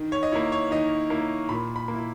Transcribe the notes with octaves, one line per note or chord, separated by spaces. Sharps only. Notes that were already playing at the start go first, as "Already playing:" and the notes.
Already playing: D#3
C#5
D#5
A#3 E4 C#5
C#5
D#3 D#5
A#3 E4
A#2 B5
B5
A#3
E4